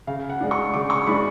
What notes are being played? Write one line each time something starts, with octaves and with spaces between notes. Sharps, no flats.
C#3 F5
F#5
G#3 D4
C#6
C#3 D6
C#6
G#3 D4 B5